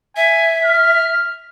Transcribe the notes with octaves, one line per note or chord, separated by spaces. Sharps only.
E5 G#5
F6